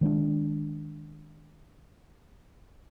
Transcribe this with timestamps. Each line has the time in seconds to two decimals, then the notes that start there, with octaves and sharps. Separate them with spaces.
0.01 D#3 G#3 C#4 D4